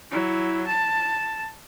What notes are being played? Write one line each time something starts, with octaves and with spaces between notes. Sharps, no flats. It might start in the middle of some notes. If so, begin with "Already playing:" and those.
F#3 E4
A5